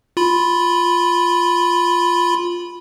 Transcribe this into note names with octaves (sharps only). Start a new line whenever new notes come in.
F4 B5